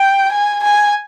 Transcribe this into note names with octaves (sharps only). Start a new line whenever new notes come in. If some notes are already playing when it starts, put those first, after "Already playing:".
Already playing: G5
G#5
G#5